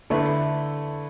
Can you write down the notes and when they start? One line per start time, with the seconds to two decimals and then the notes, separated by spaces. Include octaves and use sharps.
0.10 D3 A3 E4 B4 E5